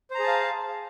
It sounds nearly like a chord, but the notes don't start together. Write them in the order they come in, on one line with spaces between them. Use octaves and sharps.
C5 A#5 G#4 A5 F5